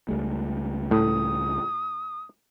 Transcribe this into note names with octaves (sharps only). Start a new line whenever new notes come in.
C#2 G3 A3
A2 D#6